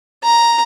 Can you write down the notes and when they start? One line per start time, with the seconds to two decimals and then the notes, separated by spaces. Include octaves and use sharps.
0.23 A#5